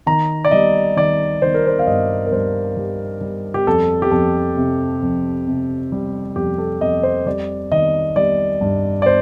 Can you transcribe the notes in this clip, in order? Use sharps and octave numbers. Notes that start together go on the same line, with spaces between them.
D#3 A#5
D5
G3 D#5
D#3 D5
D#3 C5
A#4
C5
F5
G2 D#5
A#4
G2 C5
G3
G3
G4
F2 A4
G4
F2 A4
C3
F2
C3
G3
F2 G4
A4
F2 D#5
C5
G3 D5
D#3 D#5
G3 D5
G2
D5
C5